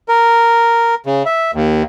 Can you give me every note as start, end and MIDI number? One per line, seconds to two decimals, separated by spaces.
0.08 0.95 70
1.06 1.23 49
1.26 1.51 76
1.54 1.83 39